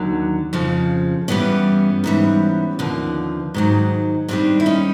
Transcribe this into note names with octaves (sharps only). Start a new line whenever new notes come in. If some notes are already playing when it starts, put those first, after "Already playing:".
Already playing: D#2 D3 F#3
F2 C#3 F3
G2 E3 G3 B3 C#4
G#2 E3 G3
D#2 D3 F3
G#2 D#3 F#3
G2 D#3 G3 C4 D4
E4
C#4 D#4